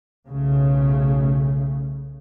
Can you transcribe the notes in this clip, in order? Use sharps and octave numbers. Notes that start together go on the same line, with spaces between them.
B1 C#3 A3